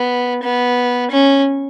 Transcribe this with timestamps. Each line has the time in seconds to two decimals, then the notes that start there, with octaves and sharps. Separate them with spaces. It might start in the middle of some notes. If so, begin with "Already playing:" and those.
Already playing: B3
0.43 B3
1.11 C#4